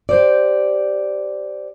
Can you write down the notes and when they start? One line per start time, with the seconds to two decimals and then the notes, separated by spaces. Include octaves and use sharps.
0.09 G4 C5 D5